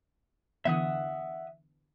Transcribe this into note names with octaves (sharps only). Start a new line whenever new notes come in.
D3 E3 B3 E5 F#5 D#6